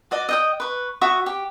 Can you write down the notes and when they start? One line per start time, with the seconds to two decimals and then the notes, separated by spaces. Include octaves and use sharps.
0.11 F#4 D5 D#5
0.29 D#5 G5 D#6
0.60 B4 C#6
1.01 F#4 E5 C#6 D#6
1.26 G4